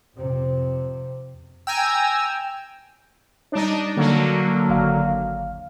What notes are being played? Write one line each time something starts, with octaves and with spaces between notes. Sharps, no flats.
F2 C3
G5 G#5 A#5 E6
G3 D4 D#4 C#5
D3 F#3 A#3
G#1 F5 F6